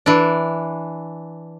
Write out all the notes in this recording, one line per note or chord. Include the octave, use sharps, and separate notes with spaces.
E3 D4